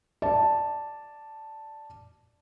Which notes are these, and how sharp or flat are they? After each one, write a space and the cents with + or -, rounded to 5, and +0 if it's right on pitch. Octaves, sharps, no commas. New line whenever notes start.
D5 +0 A5 +0